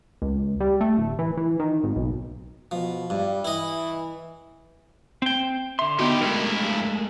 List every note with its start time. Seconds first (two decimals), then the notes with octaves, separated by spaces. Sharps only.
0.22 C#2
0.60 G3
0.81 A3
0.97 D1
1.19 E3
1.37 E3
1.60 D#3
1.83 G#1
1.96 B1
2.71 B2 F3
3.10 G2 G3
3.45 E3 E4 D#5
5.22 C4 G5
5.79 D3 E5 C6
5.99 B3 D#4 E4 F#4 G4
6.21 G2 G#3 A3 E4 A#4